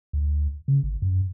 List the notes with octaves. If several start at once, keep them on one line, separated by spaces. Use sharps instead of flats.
D2
C#3
G#1
F#2